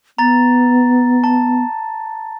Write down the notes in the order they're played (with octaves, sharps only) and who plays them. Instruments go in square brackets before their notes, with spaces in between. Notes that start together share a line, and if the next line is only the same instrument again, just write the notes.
[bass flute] B3 [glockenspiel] A#5 A6
[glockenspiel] A5